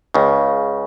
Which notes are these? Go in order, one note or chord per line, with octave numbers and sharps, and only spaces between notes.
C#2 C#3